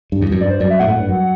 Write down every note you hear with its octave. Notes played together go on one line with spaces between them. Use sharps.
G2
E2
F#2
G2 D5
C5
F#2 D5
E5
A2 F#5
A2
G2
F#2